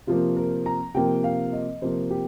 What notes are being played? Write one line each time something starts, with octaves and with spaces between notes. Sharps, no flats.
C3 F3 A#3 F4
A#4
A#5
C3 F3 A#3 G5
F5
D#5
C3 F3 A#3 C5
G4